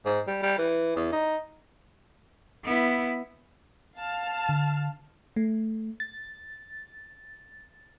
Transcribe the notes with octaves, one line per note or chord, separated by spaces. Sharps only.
G#2
G3
G3
E3
E2
D#4
B3 E4
F5 A5 F6
D3
A3
A6